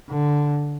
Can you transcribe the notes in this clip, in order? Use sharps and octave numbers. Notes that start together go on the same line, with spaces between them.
D3